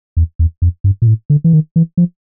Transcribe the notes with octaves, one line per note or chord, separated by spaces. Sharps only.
E2
E2
F2
G2
A#2
A2
D3
E3
D#3
E3
F3